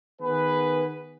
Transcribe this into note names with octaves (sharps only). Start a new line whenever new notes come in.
D#3 B3 G#4 B4